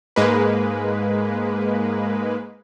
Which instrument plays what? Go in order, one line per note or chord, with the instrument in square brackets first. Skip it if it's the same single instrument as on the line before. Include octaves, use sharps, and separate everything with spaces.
[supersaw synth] G#2 G#3 A#3 B4